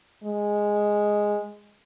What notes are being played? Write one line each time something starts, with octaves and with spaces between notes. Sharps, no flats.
G#3